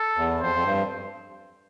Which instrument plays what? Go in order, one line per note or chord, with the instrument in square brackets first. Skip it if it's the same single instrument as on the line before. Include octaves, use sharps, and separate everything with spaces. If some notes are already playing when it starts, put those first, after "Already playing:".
Already playing: [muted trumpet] A4
[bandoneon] E2
[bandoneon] F2 [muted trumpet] C5
[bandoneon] F2
G2